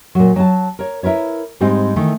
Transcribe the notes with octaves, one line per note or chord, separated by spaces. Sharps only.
A#2 F#3
F#3 G#5 A5
A#4 C#5
E4 A#4 B4 C#5
G#2 G3 G#3 C4 D#4
D#3 E3 A3